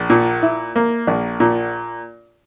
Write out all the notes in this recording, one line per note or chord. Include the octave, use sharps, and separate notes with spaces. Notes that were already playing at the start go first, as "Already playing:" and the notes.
Already playing: A#1
A#2
E4
A#3
A#1
A#2